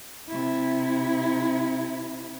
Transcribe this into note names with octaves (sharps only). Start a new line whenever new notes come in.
C3 E4